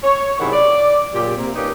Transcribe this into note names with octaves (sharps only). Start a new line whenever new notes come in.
C#5
F#2 C3 D#3 E4 G#4 F#5
D5
F#2 A#2 C#3 G4
C3 A#3
A#3 C#4 D#4 G4 A#4 B4